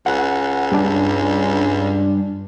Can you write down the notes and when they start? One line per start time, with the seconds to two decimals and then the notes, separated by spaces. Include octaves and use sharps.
0.06 C#2 F#5
0.72 G2 D4